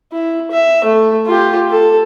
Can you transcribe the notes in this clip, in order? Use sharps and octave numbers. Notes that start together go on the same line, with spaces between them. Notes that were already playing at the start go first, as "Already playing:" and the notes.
E4
E5
A3
F4 G4
A4